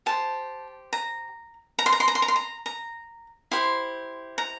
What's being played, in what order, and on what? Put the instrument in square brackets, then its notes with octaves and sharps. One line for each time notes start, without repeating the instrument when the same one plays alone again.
[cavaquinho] G4 C5 A5
A#5
A#5
C6
A#5
C6
A#5
C6
A#5
C6
A#5
A#5
E4 G4 C5 C6
A#5